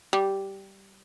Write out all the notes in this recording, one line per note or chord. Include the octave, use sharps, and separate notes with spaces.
G3